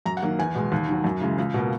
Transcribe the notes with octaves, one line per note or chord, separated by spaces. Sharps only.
F#2 A#5
F#5
D#3 F#3 A#3
E2 G#5
B2 G#3
D#2
D#3 F#3
F#2
C#3 E3 G#3
C#2
B2 A#3